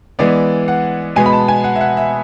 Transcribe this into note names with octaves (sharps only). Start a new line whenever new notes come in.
E3 G#3 B3 D5
F#5
B2 G#3 B3 G#5
B5
A5
G#5
F#5
E5
F#5
E5